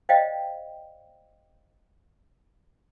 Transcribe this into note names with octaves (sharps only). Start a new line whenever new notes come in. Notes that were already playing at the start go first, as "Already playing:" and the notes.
C5 D5 D#5 F5 G5